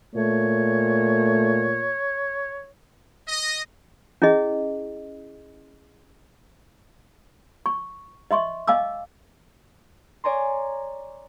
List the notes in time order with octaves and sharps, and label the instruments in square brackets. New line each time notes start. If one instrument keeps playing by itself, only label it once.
[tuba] A#2 [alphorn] A3 [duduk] C#5
[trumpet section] D#5
[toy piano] C#4 E4 G#4 D#5
C#6
D#5 E5 C6 C#6
D#5 F5 G#5 D6 E6
[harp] C#5 D5 G#5 A#5 C6